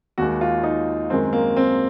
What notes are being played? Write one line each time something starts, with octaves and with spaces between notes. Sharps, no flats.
D#2 D#3 G#3 F#4
F4
D#4
F#2 D#3 G#3 C4
A#3
C4